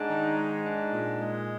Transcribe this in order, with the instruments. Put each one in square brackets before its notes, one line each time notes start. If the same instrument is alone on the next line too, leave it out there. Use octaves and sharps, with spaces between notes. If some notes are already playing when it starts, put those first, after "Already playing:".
Already playing: [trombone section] G#2 [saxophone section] D4
[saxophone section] D#3
G#3
D4
A#2
G#3